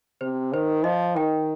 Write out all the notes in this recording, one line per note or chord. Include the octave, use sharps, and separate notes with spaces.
C3 C5
D#3 C5
F3 D#5
D#3 G5